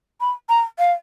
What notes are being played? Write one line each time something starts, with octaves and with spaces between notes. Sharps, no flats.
B5
A#5
F5